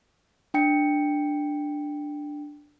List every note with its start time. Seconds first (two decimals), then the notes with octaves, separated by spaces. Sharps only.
0.54 D4 G5 C#7